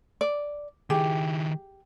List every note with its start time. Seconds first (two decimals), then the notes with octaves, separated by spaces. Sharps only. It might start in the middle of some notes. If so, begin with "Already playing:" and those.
0.21 D5
0.90 D#3 E4 G4 G#4